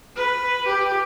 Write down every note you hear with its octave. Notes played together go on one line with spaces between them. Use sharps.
B4
G4